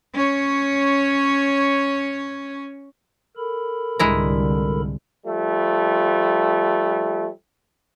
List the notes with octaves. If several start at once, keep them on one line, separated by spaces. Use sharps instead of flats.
C#4 C#5
A4 A#4 B5
C2 G#2 D3 G#3 E4 A#5
F3 G3 A3